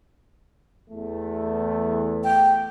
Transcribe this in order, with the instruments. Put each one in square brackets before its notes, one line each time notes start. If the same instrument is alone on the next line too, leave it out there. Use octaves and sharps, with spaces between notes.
[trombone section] E2 A3
[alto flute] G5